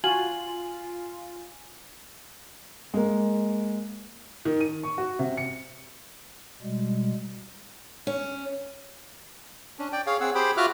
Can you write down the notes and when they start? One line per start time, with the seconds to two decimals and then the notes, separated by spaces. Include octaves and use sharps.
0.04 F4 F#4 G#5 F#7
2.94 G#3 A#3
4.45 D#3
4.61 D#7
4.83 C#6
4.98 F#4
5.19 C3
5.37 C#7
6.62 B2 G3 G#3
8.07 C#4
9.79 C#4 D4
9.93 D5 G5
10.07 G#4 C#5 F5
10.20 C4 G#4 F#5 E6
10.35 G4 G#4 C5 G5 B5
10.57 F4 F#4 E5 D6 F6 F#6